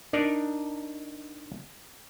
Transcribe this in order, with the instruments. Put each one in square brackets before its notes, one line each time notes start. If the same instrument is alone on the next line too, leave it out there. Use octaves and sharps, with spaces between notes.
[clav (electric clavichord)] D4 D#4 A#4 D5